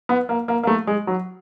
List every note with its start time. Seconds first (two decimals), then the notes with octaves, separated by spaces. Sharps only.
0.09 B3
0.29 A#3
0.48 A#3
0.63 A#3
0.67 A3
0.87 G#3
1.07 F#3